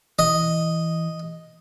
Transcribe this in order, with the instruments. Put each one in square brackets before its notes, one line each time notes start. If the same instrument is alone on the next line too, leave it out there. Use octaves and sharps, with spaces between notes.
[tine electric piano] E3 [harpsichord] D#5